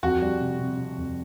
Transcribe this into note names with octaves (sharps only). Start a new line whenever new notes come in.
F2 F#4
G3
C3
C3
C3
F2